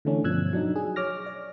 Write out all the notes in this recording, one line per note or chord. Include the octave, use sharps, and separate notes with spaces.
D3 E3 A3 C#4 D4
G2 B2 F3 E6 F#6 G#6
F#3 D4 D#4
G#4
C#5 D6 F6 A#6
D5